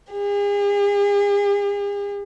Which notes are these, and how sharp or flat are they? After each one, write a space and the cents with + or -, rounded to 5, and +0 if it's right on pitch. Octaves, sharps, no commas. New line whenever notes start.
G#4 -45